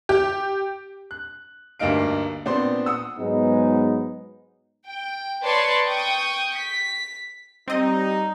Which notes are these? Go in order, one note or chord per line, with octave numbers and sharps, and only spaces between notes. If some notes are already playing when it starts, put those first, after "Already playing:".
G4
F#6
D2 G2 A#3 D#4 F5 D7
A#2 B3 C4 D4 C5 C6
F#5 D#6 E6
G#2 F#3 G#3 B3 D#4
G5
B4 C#5 D5 A5 C6 C#6
G5 C#6 D#6
B6
G3 C4 D#4 D#5